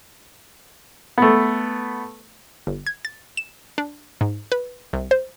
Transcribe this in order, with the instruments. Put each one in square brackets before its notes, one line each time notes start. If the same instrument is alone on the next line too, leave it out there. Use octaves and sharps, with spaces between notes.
[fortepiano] A3 B3
[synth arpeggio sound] G1
G#6
A6
E7
D4
G#2
B4
C2
C5